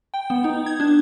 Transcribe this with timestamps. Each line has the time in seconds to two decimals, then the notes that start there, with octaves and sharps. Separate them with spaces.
0.14 G5
0.30 B3
0.44 D#4
0.66 G#6
0.80 D4